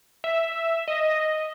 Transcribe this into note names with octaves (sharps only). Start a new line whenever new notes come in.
E5
D#5